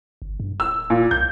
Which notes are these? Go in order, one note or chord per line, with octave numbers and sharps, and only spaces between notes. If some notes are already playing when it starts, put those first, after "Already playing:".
G1
G2
D1 E6
A#2
C2 G6